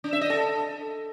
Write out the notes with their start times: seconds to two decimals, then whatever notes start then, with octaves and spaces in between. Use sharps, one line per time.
0.04 D4
0.13 E5
0.21 D#5
0.30 A4